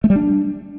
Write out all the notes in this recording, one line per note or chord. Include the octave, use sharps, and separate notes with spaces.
A3
G3
D4